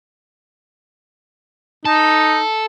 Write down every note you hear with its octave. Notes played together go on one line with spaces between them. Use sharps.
D#4 A4